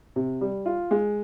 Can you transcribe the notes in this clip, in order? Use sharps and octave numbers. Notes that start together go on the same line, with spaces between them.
C3
G3
F4
G#3